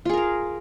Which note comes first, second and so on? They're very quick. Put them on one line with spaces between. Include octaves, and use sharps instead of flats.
F4 G#4 A#4 F5